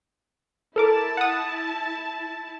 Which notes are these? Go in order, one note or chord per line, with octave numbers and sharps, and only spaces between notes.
E4 A4 A#4 A5 D6
F#5 D#6